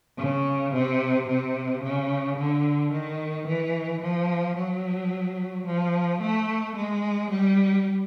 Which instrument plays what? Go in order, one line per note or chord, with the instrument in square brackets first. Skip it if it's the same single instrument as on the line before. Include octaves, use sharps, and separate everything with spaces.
[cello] C#3
C3
C3
C#3
D3
D#3
E3
F3
F#3
F3
A3
G#3
G3